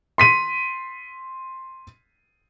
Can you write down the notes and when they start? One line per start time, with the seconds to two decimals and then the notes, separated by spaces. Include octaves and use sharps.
0.18 C6 B6 D#7